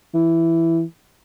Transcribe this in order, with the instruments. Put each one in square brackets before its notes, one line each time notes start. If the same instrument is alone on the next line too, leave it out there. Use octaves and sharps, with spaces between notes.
[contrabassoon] E3